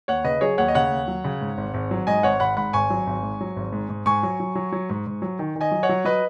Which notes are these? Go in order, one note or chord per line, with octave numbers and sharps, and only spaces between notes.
D#2 C#5 F#5
C#3 B4 D#5
F#3 G#4 C#5
D#2 C#5 F#5
D#5
C#3 C#5 F#5
D#2
F#3
C#3
G#2
G#1
G#1
F#3
G#2 D#5 G#5
G#1 C#5 F#5
G#1 F#5 B5
G#2 F#5 B5
G#1 G#5 C#6
F#3
G#1
G#2
F#3
G#1
G#2
G#2
G#2 G#5 C#6
F#3
F#3
F#3
F#3
G#2
G#2
F#3
D#3
D#3
D#5 G#5
F#3
C#5 F#5
F#3
F#3 B4 D#5